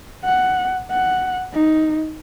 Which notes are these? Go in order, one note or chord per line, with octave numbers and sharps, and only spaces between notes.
F#5
F#5
D#4